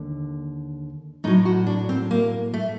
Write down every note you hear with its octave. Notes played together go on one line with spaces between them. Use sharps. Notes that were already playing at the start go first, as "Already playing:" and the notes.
Already playing: D#2 D3
A2 F#3 D#4
F#4
D4
C4
A#3
A3